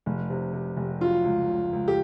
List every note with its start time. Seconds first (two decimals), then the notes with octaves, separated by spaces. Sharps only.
0.06 F1
0.30 C3
0.53 C3
0.77 F1
1.01 F#3 F4
1.24 C#2
1.49 C#2
1.73 C#2
1.88 G4